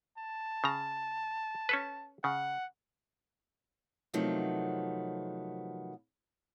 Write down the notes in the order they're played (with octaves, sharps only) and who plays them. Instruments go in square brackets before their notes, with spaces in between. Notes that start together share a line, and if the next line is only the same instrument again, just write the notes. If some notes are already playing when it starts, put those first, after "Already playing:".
[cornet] A5
[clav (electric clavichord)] C#3 A#5
C#4 A4 B4
[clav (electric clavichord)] C#3 [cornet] F#5
[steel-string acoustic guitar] C3 D#3 F3 F#3 A3 B3